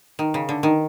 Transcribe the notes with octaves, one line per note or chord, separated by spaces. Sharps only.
D#3
C#3
D3
D#3